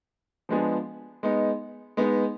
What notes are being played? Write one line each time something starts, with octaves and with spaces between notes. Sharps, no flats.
F3 G#3 B3 D4 G#4
G#3 B3 D#4
G#3 B3 D#4